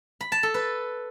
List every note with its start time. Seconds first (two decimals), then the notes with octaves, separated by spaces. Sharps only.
0.21 B5
0.32 A5
0.43 A4
0.54 B4